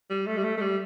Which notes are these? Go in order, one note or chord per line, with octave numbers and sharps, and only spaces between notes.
G3
A3
G3
A3
A3
G3